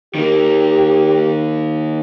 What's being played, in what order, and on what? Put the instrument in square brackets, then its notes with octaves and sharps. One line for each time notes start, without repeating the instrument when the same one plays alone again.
[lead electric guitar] D#3 A#3 [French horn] G4